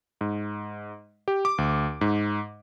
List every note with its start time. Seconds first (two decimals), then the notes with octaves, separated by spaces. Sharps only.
0.21 G#2
1.28 G4
1.45 D6
1.58 D2
2.01 G#2